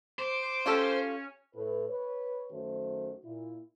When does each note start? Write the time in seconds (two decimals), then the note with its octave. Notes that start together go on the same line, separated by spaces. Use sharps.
0.19 C5 D6
0.66 C#4 F4 G4 A4
1.55 A2 B4
1.89 B4 C#5
2.51 F#2 D#3 A3 F#4 C5
3.24 A#2 E4